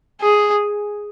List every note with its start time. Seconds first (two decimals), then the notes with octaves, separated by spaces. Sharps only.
0.21 G#4